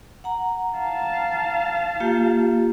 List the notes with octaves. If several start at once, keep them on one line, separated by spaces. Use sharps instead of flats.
F#5 A#5
F5 A5
A#3 F4 G4